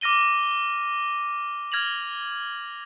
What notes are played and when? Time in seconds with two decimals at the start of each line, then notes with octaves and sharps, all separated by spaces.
0.01 D6 F6 A#6 D#7 G7
1.72 F6 G#6 A#6 F7 F#7